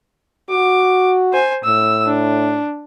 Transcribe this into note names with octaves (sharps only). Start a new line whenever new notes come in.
F#4 D6
C5 G#5
A2 E6
D4